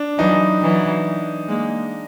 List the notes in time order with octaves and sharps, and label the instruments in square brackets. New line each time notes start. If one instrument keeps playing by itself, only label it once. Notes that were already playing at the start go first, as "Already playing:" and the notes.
Already playing: [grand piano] D4
[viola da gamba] E3 F#3 [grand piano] D#4
[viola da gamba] E3 F#3
G#3 A#3